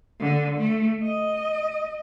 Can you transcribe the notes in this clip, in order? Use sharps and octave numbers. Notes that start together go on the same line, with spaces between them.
D3
A3
D#5